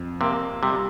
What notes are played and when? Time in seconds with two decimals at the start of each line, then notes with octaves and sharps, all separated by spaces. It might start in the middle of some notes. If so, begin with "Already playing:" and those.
Already playing: F2
0.21 C3 A#3
0.63 C3 G3